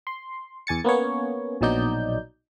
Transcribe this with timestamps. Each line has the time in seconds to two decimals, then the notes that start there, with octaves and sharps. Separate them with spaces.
0.07 C6
0.67 E2 G#5 A6 C#7
0.84 A#3 B3 C#4 C#5
1.61 A#1 B2 F#3 D#4 D5 G6